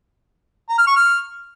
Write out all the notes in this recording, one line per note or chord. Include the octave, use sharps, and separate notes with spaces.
A#5
F6
C#6
F6